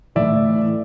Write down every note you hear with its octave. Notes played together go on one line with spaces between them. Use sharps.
A2 E3 A3 D5 E5